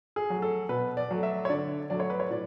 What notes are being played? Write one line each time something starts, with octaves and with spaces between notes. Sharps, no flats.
G#4
F#3 A3
A4
B2 B4
D5
F#3 A3
E5
C#5
D3 D5
F#3 A3 D5
C#5
B4
C#5
A2 D5